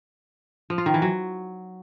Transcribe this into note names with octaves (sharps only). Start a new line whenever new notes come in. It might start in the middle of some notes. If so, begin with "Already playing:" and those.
F3
F4
D#3
E3
F#3